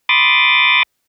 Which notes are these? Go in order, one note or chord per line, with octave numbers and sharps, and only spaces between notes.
B5 C6 D6 D#6 A6